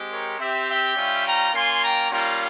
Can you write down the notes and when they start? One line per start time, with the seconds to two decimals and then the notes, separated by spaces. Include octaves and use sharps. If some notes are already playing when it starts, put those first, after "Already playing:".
Already playing: G#3 C4 G4
0.10 A#4 C#5
0.39 C4 G4 C5 E5
0.68 E5 G5
0.96 G3 C#4 F4
1.25 G5 A#5
1.53 A#3 C#4 F4 G#5 C6
1.81 G5 A#5
2.10 G3 A#3 C#4 F4 G5 A#5